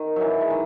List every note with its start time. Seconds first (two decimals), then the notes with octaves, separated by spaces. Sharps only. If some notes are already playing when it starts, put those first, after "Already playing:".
Already playing: D#3
0.16 E3 F#3
0.41 G#3
0.50 D#3